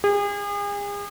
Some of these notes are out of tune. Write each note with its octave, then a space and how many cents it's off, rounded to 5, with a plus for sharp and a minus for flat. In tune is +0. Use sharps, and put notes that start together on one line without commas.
G#4 -40